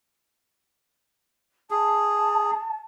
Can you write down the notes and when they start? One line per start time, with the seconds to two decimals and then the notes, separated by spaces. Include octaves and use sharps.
1.71 G#4 A5